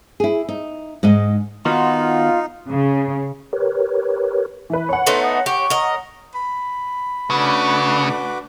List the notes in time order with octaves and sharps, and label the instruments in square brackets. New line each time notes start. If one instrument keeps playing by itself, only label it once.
[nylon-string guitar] E4 G#4
D#4
G#2 G#3 D#4 D#5
[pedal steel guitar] D#3 B3 F#4 [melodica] D#4 [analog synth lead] F4
[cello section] C#3
[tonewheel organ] G4 A#4 B4 C#5
[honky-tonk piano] E3 B4 [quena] E5
[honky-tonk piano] C#5 F#5 [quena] B5
[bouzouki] A3 B3 D#4 [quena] C6
[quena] D#6
[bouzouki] G4 [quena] C#6
[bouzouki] A#4 D#5
[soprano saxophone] B5
[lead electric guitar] C#3 [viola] A3 D4 [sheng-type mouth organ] F#4 B4 D6